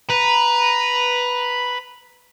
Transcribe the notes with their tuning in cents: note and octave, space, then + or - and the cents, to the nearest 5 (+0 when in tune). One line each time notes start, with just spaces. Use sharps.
B4 +0 A#5 +10